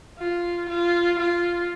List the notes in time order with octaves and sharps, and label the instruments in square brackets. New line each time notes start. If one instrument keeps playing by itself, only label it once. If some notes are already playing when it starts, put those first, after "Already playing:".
[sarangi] F4
F4
F4